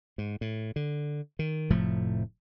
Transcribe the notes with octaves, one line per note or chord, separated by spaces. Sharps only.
G#2
A2
D3
D#3
F1 A2 F3 A3